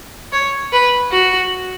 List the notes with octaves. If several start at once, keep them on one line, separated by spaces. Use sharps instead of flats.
C#5
B4
F#4